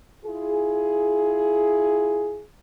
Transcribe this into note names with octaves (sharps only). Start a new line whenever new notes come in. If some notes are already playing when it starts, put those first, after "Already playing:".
E4 F4 G#4